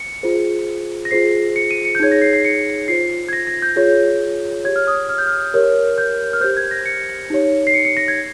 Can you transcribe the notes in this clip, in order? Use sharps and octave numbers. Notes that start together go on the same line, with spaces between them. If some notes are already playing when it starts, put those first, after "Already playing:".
Already playing: C#7
F4 G#4 C5
A#6
F4 G#4 C5 C7
C#7
D#7
C#7
G6
D#4 G#4 C#5 G#6
A#6
C7
C7
C#7
F4 C5 C7
G#6
A#6
A#6
G6
F4 G#4 C#5
G4 C#5 G#6
F6
D#6
F6
G6
F6
G4 A#4 C#5
G6
F6
G4 C5 G6
G#6
A#6
C#7
D#4 G4 C#5
C7
C#7
C#7
A#6
G#6